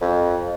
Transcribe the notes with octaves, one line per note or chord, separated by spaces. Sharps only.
F2